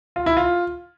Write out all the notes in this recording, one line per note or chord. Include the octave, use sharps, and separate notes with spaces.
F4
E4
F4